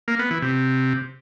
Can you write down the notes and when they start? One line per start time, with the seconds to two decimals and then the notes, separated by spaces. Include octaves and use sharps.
0.08 A#3
0.19 B3
0.31 E3
0.42 C3